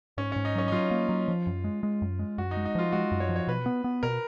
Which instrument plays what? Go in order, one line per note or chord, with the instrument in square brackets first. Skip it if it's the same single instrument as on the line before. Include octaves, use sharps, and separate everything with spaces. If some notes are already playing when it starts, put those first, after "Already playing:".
[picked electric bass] G#2 [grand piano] C#4
[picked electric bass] G#2 [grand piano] C#4
[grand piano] D#4
[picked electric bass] F#3 [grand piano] C#4
[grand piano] D#4
[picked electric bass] F#3 [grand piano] F4
[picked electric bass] A#3
F#3
F3
F#2
G#3
G#3
F#2
G#3
[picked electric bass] F#2 [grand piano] F#4
[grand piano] D#4
[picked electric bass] G#3
[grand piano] D#4
[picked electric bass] F3 [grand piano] F4
[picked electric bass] G#3 [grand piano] F#4
[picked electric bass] F#2
[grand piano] C#5
[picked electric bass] F3
[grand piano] C#5
[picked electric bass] B2 [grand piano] B4
[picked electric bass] B3
B3
[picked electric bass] B2 [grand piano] A#4